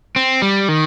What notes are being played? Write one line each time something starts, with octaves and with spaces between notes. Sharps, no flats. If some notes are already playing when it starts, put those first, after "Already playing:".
C4
G3
D#3